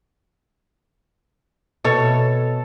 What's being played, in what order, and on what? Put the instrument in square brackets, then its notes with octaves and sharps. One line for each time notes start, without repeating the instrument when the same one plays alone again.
[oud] B2 C#5 [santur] A4